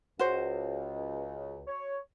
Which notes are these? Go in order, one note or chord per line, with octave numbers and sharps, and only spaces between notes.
C#2 F#4 C5
C#5